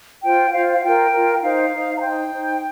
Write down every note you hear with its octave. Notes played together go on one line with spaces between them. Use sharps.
F4 C5 G5
F4 C5 F5
F5
F4 A#4 G5
F4 A#4
D#4 C5 F5
D#4 C5
A#5
D#4 C5 G5
D#4 C5